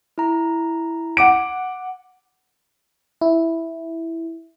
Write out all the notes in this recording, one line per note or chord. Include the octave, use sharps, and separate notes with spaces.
E4 A#5
F#5 D6 D7
E4